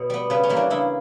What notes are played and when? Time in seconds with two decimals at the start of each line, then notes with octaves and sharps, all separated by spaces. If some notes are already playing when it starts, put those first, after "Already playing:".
Already playing: B2 C#5
0.10 G3 B3
0.30 C#3 B4
0.43 C#4
0.49 E3 G3 A#3
0.56 D4
0.70 C#3 E4